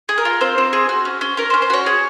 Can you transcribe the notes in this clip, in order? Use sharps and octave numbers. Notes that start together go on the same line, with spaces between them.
G#4
A#4
F4
C4 C5
C4
G#4
F#4
C#4
C#4
C#4 A#4
C5
C#4
C5
F#4 C#5
G#4